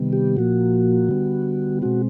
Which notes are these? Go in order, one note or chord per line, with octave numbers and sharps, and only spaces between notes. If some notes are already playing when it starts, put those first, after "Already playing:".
Already playing: C3 D#3 G3 B3
G4
A#2 F3 A#3 F#4
D3 G3 B3
B2 G#3 C4 F#4